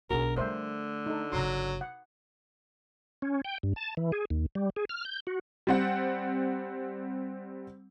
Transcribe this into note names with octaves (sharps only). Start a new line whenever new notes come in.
B1 D4 F#4 G#4 A#4
D3 G3 A3 A#4 C5 E5
D#4 A4
G1 C#3 F#3 A#5 C6
F#5
C#4
G5
G2
A5
E3
G#4
D#2
G3
G#4
F6
G6
F#4
G3 C4 F#5